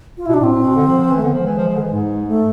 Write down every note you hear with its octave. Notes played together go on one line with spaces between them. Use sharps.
F4
B2 E4
D4
A2
C4
A2
B2
D3
F3
F3
E3
A3
D3 B3
F3
G#3
E3
F3
F3
D3
E3
G#2
A3